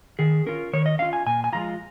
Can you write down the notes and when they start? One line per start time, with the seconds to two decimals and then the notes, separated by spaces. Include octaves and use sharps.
0.19 D#3 G#4
0.46 C#4 F4 A#4
0.73 D#3 C#5
0.86 D#5
0.99 C#4 F4 F5
1.13 G#5
1.26 A#2 G#5
1.44 G#5
1.53 F3 G#3 F4 A#5